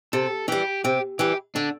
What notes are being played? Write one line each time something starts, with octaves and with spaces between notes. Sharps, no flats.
C3 A4
E3 G3 G4
C3 G4
E3 G3 G4
D3 D4